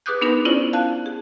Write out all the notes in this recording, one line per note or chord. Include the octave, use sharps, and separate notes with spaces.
G#4 B4 D6 D#6 F#6 G6
B3 D4 D#4 A#4 B4
C#4 E4 F4 C5 D5
F5 A5 F#6
G#4